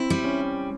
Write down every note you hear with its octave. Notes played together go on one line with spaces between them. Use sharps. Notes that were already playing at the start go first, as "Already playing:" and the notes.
Already playing: C4 E4
G3
C#4